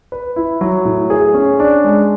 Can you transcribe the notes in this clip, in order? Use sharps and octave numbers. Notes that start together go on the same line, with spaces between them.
B4
E4
F#3
A2
G#4
C#4
D4
G#3